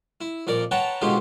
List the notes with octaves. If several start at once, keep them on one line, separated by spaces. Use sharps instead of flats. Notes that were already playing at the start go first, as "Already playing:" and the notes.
E4
F2 A#2 A#4 D5
B4 C#5 F#5 G5 A5 A#5
G#2 B2 D3 F#3 F4 G4